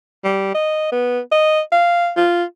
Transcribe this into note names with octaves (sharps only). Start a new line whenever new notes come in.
G3
D#5
B3
D#5
F5
F4